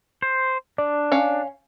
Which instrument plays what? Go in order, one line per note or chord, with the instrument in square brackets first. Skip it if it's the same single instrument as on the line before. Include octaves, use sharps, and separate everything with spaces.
[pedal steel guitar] C5
[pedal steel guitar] D4 [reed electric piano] D5
[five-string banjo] C#4 F5